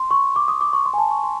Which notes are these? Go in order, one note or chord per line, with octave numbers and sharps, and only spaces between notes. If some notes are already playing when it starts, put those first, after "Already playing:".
Already playing: C6
C#6
D6
D#6
D6
C#6
C6
G#5
A5
C#6
C6